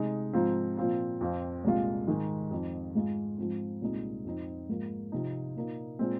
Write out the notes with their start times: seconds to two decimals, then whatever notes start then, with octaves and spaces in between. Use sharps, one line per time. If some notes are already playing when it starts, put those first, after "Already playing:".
Already playing: C3 G#3 D#4
0.33 G#2 F3 C4 F4
0.77 A#2 F3 C4 F4
1.21 F2 F3 C4 F4
1.64 C2 A#2 G#3 F4
2.08 G#2 D#3 G#3
2.51 F2 F3 C4 D#4
2.95 G#2 G#3 F4
3.38 G#2 F3 C4
3.82 C2 A#2 G#3 D#4
4.25 F2 F3 C4 D#4
4.69 G#2 F3 A#3
5.12 C3 F3 C4 D#4
5.56 A#2 A#3 D#4
5.99 A#2 G#3 C4